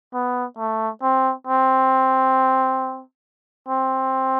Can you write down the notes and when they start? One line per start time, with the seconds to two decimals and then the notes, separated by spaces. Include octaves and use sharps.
0.14 B3
0.58 A3
1.02 C4
1.47 C4
3.69 C4